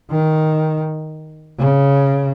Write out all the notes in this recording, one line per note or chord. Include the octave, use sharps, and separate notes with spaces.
D#3
C#3